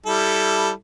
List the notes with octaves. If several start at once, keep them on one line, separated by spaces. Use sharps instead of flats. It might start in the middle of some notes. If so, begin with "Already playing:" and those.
G3 E4 A4